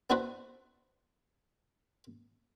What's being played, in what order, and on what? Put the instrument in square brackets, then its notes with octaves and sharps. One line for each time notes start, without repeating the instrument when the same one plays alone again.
[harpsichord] B3 D4 E4 F#4 B4 C5